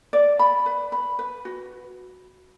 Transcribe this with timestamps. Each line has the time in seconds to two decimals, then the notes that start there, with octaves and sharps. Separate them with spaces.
0.13 D5
0.39 B5
0.66 B4
0.92 B5
1.19 B4
1.45 F#4